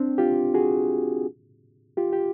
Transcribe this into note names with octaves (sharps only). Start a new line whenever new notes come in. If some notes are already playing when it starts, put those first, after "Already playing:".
Already playing: C4 D4
F4 G4
F#4 G#4
F4 G4
G4